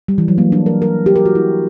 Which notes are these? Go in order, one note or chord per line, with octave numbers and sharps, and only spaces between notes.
G3
E3
F#3
A#3
D4
A#4
A#4
G4
A#4
F#4
E4